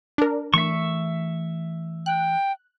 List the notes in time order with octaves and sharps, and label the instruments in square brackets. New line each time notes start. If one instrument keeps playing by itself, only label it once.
[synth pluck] D4 A#4
[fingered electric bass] E3 A3 [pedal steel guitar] E5 C#6
[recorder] G5 [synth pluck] F#6